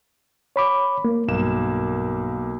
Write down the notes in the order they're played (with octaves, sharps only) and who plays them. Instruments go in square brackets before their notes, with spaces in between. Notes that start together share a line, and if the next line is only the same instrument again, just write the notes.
[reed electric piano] C#5 B5 D6
A#3
[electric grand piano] B1 A#3 E7 [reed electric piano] G2